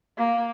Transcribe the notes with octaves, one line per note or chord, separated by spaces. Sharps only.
A#3